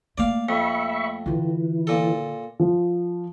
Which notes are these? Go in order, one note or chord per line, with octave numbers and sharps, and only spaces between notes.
A3 A#3 D5 F5
F2 E5 B5 C#6
D3 E3 F4
A#2 A4
F3